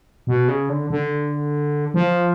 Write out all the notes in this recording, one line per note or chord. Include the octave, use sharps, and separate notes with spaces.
B2
C#3
D3
D3
F3